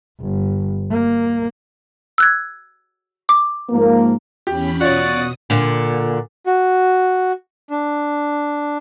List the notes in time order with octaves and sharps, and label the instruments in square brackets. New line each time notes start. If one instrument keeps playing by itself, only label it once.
[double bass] G1
A#3
[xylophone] E6 F#6 G#6
D6
[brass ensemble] G#2 F3 A#3
[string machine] E2 C#4 B5 [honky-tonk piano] G4
[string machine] B2 D#6 [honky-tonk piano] F4 C#5 [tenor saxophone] F#4 [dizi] D5
[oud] A#2 D3
[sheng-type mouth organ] F#4
D4